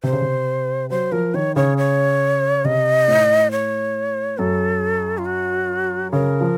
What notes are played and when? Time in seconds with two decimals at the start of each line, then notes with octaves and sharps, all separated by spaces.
0.03 C3 C5
0.13 C#3
0.21 C3
0.90 F#3 C5
1.12 F3 A#4
1.34 D#3 C#5
1.56 C#3 C#5
1.78 C#5
2.64 C3 D#5
3.08 A2
3.51 C#5
4.38 F#2 A4
5.18 F4
5.25 F#4
6.12 C#3 A#4
6.41 F3